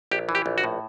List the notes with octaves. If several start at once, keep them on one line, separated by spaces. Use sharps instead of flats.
A#1 G4
E3
G4
A#1
F#4
A2